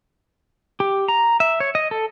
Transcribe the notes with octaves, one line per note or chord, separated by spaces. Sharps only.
G4
A#5
E5
C#5
D#5
A4